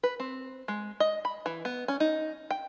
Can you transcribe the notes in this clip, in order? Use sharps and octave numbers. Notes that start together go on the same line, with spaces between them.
B4
C4
G#3
D#5
B5
E3
B3
C#4
D#4
G5